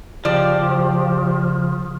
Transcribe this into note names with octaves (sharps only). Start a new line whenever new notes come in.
C#3 F3 G4 D5